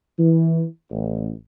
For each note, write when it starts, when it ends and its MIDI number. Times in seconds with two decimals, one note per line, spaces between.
0.18 0.65 52
0.91 1.30 33